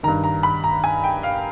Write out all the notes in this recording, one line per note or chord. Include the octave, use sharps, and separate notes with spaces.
G2 D#3 A#5
A#5
B5
A#5
G#5
G5
F5